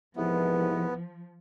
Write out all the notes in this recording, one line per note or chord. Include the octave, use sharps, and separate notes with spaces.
C2 G#2 E3 F3 B3